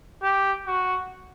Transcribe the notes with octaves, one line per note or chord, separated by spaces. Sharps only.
G4
F#4